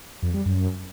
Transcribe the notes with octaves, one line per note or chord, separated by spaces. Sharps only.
F2
G3
F#2